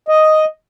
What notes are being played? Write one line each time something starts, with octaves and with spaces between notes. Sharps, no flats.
D#5